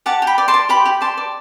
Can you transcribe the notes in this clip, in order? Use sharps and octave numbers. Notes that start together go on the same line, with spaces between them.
G4 F#5 A5
G4
G5 B5
D5
A5 C6
D5
G4 G5 B5
G4
D5 A5 C6
D5